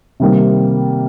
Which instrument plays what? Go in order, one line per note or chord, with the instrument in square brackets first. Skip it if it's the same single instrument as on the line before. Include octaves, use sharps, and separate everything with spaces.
[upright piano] C3 D#3 G3 A#3